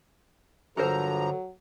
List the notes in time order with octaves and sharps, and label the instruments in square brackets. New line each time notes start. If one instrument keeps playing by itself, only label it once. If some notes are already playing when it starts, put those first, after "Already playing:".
[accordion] G2 F3 A#5 [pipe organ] D3 [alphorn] F#3 [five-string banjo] A4 A#4 C5